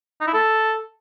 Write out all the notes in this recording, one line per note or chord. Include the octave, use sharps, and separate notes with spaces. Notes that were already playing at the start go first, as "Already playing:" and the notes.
D#4
E4
A4